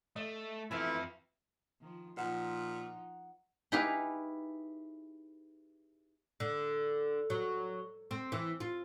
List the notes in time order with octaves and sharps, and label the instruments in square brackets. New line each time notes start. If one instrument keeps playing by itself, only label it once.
[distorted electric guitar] A3 [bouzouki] D#5
[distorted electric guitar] F2 F5 [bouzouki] E3 A3 B3 [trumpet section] C4 E4
[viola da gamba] D#3 F3
[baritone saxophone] A#2 [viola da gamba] F3 D#4 [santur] F#5
[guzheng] D#4 E4 G4 G#4 B4 F5
[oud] D3
F#3
C4
E3
F4